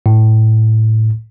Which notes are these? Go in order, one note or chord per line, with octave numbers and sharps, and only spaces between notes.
A2